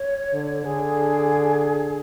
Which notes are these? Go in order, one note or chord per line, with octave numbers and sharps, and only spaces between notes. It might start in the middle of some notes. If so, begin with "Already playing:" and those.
Already playing: C#5
D3
D3 G#4